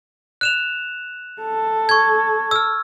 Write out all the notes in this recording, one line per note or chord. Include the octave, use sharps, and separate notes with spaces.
F#6 E7 F7
A4
C#6 G#6
E6 F6